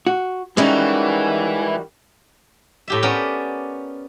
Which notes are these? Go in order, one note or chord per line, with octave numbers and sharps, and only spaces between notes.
F#4
D#3 E3 G3 G#3 C#4 D#4 F#4
A2 G4 E5
B3 C#4 A#4 D5 G5 B5